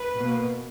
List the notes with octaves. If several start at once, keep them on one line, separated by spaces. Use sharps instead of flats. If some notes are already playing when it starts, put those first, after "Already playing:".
Already playing: B4
B2 A#3